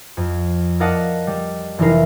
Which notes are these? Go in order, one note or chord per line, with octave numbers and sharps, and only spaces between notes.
F2
A#4 D5 D#5 F5 F#5 A5
G3
F1 E3 D#4 E4 A#4 C7